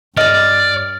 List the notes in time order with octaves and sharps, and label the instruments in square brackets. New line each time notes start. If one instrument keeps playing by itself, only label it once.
[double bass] G2 [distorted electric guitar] D5 [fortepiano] D#5 [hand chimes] F6 A6